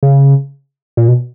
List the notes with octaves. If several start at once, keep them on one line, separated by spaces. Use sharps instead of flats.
C#3
A#2
B2